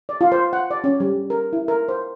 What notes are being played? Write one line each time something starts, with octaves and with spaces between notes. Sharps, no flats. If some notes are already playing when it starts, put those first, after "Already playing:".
D5
F4
C5
F#5
D5
C#4
G3
A#4
E4
A#4
C5